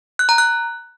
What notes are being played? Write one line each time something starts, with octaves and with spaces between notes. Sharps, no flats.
F#6
A#5
F#6